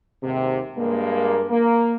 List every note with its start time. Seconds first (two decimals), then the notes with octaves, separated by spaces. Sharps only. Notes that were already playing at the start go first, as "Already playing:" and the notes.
0.22 D#2 G#2 C3
0.77 G2 G#3 A#3
1.50 A#3